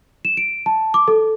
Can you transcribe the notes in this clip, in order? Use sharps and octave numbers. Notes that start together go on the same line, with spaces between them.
E7
D7
A5
D6
A4